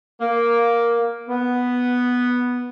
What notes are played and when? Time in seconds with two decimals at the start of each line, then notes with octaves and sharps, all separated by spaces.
0.21 A#3
1.28 B3